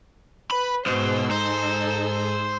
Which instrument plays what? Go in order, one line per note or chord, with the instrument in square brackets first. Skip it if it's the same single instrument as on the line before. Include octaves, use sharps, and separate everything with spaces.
[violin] B4 [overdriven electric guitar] B5
[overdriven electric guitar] C2 B2 [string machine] G#2 G#4 E6 [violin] C5
[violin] D#4 A4 [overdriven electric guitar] C5